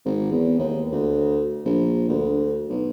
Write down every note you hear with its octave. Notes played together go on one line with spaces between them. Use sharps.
G#1
E2
D#2
D2
A#1
D2
B1